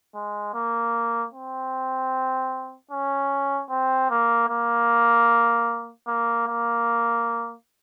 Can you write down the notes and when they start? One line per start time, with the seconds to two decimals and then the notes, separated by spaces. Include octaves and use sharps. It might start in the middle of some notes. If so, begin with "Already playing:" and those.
0.15 G#3
0.54 A#3
1.33 C4
2.91 C#4
3.70 C4
4.10 A#3
4.49 A#3
6.08 A#3
6.47 A#3